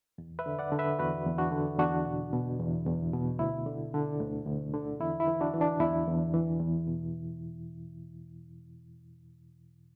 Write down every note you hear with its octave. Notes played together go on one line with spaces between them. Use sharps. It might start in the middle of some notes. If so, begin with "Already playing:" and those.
E2
B4 E5
D3
D5 F#5
D3
B4 E5
E2 F#4 B4
E2
D4 F#4
D3
E2 D4 F#4
B2
B2
E2
E2
B2
D2 E4
D3
D3
D2
D2
D3
E2 E4
E4
E3
D4 F#4
E3
D4
E2 E4
E2
E3
E2
B2